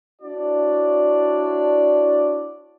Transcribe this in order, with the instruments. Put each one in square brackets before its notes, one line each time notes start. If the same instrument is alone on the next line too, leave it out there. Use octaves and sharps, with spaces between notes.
[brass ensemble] D4 E4 F#4 C#5 D5